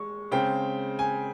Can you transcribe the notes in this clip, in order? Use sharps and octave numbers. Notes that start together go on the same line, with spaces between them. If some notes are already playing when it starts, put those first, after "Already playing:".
Already playing: G#3 C#6
C#3 G#3 C4 G5
G#5